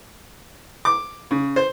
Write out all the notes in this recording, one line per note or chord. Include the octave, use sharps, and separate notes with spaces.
D6
C#3
C5